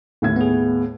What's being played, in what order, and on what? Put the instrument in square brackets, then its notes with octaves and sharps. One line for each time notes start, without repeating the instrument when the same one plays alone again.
[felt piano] D#2 A2 G#6
[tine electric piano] B3 G#4